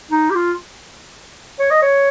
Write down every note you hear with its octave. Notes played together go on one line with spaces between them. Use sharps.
D#4
G4
F4
C#5
D#5
C#5